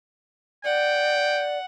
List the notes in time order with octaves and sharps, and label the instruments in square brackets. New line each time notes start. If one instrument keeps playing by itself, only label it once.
[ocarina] D5 [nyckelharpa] F#5 [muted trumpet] G5